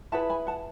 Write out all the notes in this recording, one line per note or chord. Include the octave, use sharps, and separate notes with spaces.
E4 G#4 B4 F#5 A5
G#5 B5
F#5 A5